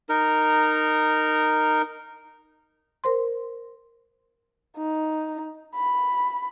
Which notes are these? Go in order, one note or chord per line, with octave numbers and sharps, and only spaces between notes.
D#4 A#4
A#4 C5 C6
D#4
B5